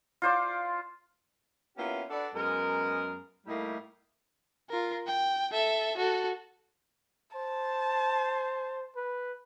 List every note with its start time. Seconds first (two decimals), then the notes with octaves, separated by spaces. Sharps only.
0.22 F4 C5 D5
1.77 A#3 B3 C#4 E4 F4 G4
2.10 D4 F#4 A4 B4 D5
2.34 F#2 G#3 B3 A#4
3.46 A2 G3 A3 A#3 D#4 E4
4.70 F4 A#4
5.07 G5
5.52 A4 E5
5.97 F#4 A4
7.36 C5 A5
8.96 B4